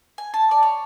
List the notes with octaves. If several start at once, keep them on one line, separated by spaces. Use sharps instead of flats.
G#5
A5
D5
C#5